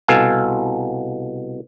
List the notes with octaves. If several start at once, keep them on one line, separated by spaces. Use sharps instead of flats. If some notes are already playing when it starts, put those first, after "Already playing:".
C2 B2 A4 F5 G#5